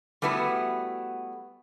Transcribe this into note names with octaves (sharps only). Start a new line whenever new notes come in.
G3 A3 B3 E4 F#4